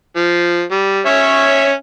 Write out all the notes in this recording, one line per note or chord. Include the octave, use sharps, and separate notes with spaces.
F3
G3
C#4 C#5 E5